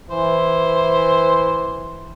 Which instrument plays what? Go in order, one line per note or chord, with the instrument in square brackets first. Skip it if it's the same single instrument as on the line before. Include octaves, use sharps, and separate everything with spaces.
[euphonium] E3 [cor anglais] C5